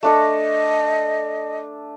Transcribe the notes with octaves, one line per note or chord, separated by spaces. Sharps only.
A3 D4 A4 D#5